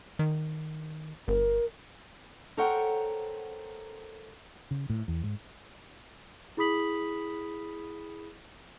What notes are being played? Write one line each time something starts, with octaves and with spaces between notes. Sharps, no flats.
D#3
G1 A#4
A4 A#4 C5 C#5 F#5 G5
C#3
A2
E2
G#2
E4 G#4 B5 D#6 B6 F#7